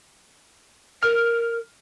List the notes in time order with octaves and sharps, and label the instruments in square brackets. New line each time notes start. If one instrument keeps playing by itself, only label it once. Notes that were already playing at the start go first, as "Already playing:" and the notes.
[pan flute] A#4 [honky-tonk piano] F6